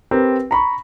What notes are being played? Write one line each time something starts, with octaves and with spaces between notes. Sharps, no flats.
C4 G4 A#4 B4
A#5 B5 C#6